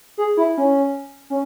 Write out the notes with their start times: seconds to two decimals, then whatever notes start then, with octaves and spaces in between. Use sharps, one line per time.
0.18 G#4
0.37 E4
0.58 C#4
1.30 C#4